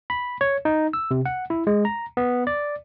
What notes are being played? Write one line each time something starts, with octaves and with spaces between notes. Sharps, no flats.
B5
C#5
D#4
E6
C3
F#5
E4
G#3
A#5
B3
D5